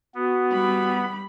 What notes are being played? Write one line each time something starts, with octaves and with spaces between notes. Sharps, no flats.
B3 F#4
G3 B5